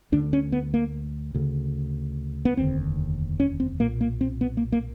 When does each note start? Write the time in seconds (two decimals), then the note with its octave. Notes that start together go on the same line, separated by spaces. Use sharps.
0.12 D2 D3 D4
0.33 C#4
0.52 B3
0.74 A#3
1.35 D2 C#3
2.45 B3
2.57 F1 D#2 D3 C4
3.40 C#4
3.60 C4
3.80 B1 A#2 A#3
4.01 A#3
4.21 C4
4.41 B3
4.57 A#3
4.72 A#3